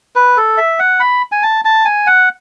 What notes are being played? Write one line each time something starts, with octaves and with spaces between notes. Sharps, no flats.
B4
A4
E5
F#5
B5
G#5
A5
A5
G#5
F#5